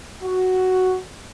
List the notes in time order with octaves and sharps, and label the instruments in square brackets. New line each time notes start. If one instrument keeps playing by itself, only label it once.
[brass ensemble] F#4